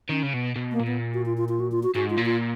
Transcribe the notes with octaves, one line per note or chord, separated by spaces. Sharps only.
D#3 C#4
C#3
B2 B3
B2
A#3
A#2
B3
F#4
F4
F4
F4
F#4
F4
F#4
G#2 F#4
F4
A#2
F4